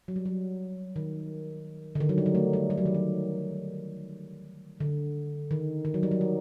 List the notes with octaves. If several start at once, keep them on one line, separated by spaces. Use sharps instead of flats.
F#3
G3
F#3
D#3
D3
D#3
F#3
G3
F#3
A3
G3
G3
F#3
D#3
F#3
D3
D#3
D#3
F#3
G3
F#3
D#4